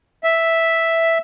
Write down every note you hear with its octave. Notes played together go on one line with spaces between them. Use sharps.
E5